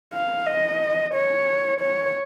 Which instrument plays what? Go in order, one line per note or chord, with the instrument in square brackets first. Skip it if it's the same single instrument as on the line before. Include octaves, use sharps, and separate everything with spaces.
[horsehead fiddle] F5
D#5
C#5
C#5